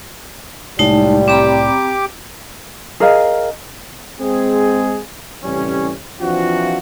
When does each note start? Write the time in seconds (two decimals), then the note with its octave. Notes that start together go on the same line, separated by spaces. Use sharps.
0.79 C2 A2 G3 G#3 D#4 A5
1.28 C4 G4 A#5 B5 D6
3.00 G#4 A#4 D#5 F5
4.20 G#3 C4 G#4
5.44 A2 C3 E3 G3 C#4
6.21 E3 F3 C4 D4 F4 F#4